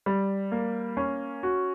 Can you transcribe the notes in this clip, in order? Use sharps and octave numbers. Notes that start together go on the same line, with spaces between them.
G3
A#3
C#4
F#4